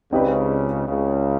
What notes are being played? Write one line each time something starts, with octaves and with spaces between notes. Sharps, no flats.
C#2 C#3 C4 D#4 G4 B4 D5
C#2 C#3